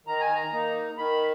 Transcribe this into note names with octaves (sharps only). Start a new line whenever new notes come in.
D#3 A#5
G#5
A#5
A#3 D#4
D#3 B5